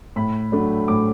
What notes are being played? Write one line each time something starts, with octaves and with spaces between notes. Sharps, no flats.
A2 B5
F#3 A3 D4
A2 D6